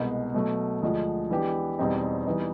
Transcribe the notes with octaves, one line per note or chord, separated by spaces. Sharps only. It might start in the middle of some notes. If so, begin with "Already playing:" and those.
Already playing: C2 B2 G#3 B3
B2 F#3 A3
D2 D3 F3 G#3
E3 G#3 B3 D4 G4
E2 B2 G3 C4 D#4
E3 G3 B3 D#4